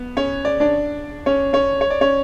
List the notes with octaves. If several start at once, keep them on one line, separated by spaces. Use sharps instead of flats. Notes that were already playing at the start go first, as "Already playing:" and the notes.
Already playing: B3
C#4 C#5
D5
D4 D5
C#4 C#5
C#4 C#5
C#5
D5
C#4 C#5